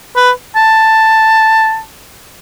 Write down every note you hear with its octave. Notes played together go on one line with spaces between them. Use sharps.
B4
A5